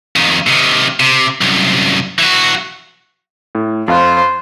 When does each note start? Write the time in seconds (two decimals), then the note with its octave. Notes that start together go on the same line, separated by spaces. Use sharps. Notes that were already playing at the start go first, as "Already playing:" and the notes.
0.16 F2 D#3
0.47 C3 D#3
1.00 C3
1.41 C2 F#2
2.19 E3 F#4
3.55 A2
3.88 F2 F4 C5 F5 F#6